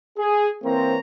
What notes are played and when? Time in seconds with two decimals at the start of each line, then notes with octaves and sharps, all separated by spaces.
0.17 G#4
0.63 E3 A#3 C4 C5 C#5 A#5